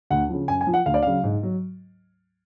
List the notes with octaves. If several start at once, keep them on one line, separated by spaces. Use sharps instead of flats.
D2 F#5
C#3 F3
F#2 G#5
G#5
F3
F#5
D2 F5
D5
C#3 F#3 F5
G#2
F#3